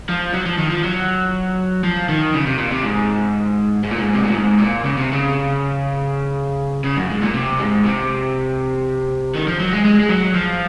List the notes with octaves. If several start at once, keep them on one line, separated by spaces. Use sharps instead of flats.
F3
F#3
F3
D#3
F3
F#3
F3
D#3
C#3
C3
A#2
C3
G#2
G#2
A#2
G#2
C3
A#2
G#2
A#2
C#3
C3
C#3
C#3
F#2
G#2
A#2
C3
G#2
C3
D#3
F3
F#3
G#3
G#3
G#3
F#3
F3